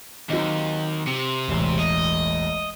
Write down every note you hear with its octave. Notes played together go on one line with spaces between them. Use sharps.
D#2 F#3 C4 D#4
C3
E1 A1
D#5